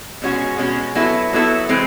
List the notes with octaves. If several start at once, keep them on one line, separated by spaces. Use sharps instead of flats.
B2 G#3 C#4 F#4
B2 G#3 C#4 F#4
F#3 B3 E4 A4
F#3 B3 E4 A4
E3 G#3 C4